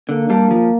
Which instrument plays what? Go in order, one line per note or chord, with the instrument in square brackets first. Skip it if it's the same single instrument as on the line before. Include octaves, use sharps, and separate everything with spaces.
[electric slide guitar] D3 [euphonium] A#3
[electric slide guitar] G3 D4
F3